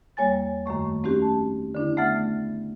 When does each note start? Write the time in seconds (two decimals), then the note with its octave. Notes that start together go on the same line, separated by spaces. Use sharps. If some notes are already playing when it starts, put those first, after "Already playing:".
0.17 E2 G3 A#3 C#5 G#5 A6
0.66 F#2 D#3 A3 C#6
1.04 A3 C4 C#4 D#4 F#4 G4
1.22 A5
1.75 D3 D4 E4
1.97 A3 B3 E5 F#5 F6 A6